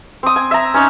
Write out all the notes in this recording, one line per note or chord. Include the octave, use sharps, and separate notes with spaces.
C4 D#6
G#5
E5 A#5
C#4 D#4 C#5